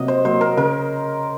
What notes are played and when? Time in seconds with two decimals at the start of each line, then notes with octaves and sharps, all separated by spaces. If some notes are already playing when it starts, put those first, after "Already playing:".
Already playing: C3 F#3 A#3 D#5
0.08 C5
0.25 F#3 A#3 C5
0.41 A#4
0.57 C#3 A#4